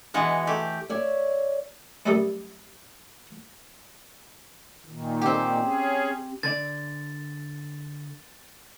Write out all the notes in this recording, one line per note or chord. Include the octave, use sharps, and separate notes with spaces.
B2 E3 G#3 F#5
A3 G4
C#5 D5 E5
F#2 G3 A3 G4 A4 D#6
A#2 D#3
C4 G4
C#4 G#4
D3 D5 A6